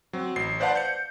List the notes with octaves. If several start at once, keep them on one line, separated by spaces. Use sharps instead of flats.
F#3 C4
A1 C7
B4 C5 D5 F5 F#5 A5
G6 C#7